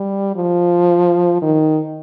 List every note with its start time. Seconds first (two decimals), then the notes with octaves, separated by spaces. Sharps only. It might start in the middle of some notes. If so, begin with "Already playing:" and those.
Already playing: G3
0.36 F3
1.42 D#3